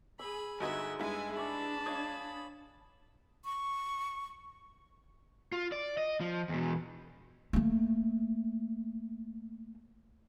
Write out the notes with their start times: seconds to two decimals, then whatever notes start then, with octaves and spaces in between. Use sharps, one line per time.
0.19 G#4 B5 E6
0.60 G1 G#3 D#4 F#4 E5 G#6
0.99 G2 G#3 E4 B4 G#5
1.37 D4 A5 B5 C#6 D6
1.86 C#5 D#5 F5 D#6 G#6
3.45 C#6
5.52 F4
5.72 D5
5.97 D#5
6.21 F3
6.49 E2 B2
7.53 A3 A#3